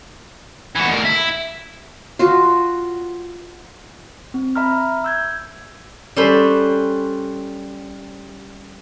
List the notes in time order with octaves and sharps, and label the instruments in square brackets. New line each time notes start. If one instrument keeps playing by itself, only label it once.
[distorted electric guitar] E3 F#4
D2 A#4
E4
[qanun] F4 F#4
[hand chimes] C4
E5 A#5 B5 F6
E6 G6 G#6
[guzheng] G3 C#4 A4 B4 C5